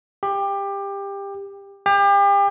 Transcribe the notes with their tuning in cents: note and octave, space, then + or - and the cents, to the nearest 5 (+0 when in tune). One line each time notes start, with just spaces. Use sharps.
G4 +20
G4 +35